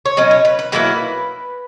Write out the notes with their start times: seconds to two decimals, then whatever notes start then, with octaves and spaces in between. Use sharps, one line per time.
0.05 C#5
0.17 B2 F#3 C#4 D#5
0.31 C#5
0.45 B4
0.59 B4
0.72 B2 F#3 A#3 E4 B4